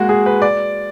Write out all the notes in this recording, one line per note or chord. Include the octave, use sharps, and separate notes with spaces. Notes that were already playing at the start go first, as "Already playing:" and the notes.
Already playing: G#3 A#3 F#4
G#4
B4
D5